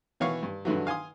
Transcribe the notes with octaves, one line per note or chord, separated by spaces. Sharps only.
B2 E3 C#5 F5 C#6
G2
G2 D3 E3 F#3
F5 G#5 C6 D#6